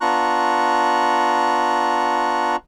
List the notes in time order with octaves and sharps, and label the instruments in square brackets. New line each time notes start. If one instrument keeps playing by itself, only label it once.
[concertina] B3 D4 F4 A#5 C#6 F#6